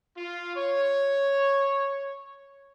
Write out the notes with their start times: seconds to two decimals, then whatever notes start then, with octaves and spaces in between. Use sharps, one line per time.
0.16 F4
0.56 C#5